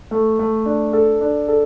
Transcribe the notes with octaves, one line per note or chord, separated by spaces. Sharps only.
A3
A3
D4
A4
D4
A4